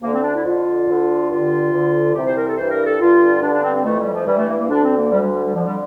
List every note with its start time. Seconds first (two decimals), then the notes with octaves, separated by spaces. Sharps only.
0.02 D2 D3 A#3
0.13 C4
0.23 D4
0.34 E4
0.44 F2 D3 F4
0.87 D2 D3
1.29 G2 D3 F4
1.72 D2 D3
2.14 C2 C3 E3 G4
2.25 C5
2.36 A#4
2.46 A4
2.57 G2 E3 C5
2.70 A#4
2.84 A4
2.99 G2 D3 F4
3.41 G2 D3 D4
3.52 D4
3.63 C4
3.73 C4
3.84 F2 E3 A3
3.98 G3
4.12 F3
4.26 G2 E3 G3
4.37 A3
4.48 A#3
4.58 A#3
4.68 D2 D3 D4
4.83 C4
4.96 A#3
5.11 D2 D3 G3
5.22 G3
5.33 G3
5.43 G3
5.53 F2 D3 F3
5.64 G3